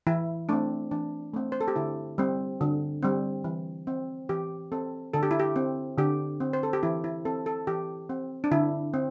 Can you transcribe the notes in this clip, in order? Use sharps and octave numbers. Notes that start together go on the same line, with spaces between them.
E3 E4
A3 C4 D4
E3 D4
A3 C4
C5
A4
G4
D3 E4
G3 C4
D3
G3 C4
E3
C4
E3 G4
C4 A4
D3 A4
G4
E4
G4
C4
D3 G4
C4
C5
A4
G4
E3 E4
E4
C4 A4
A4
E3 G4
C4
D4
D3 E4
C4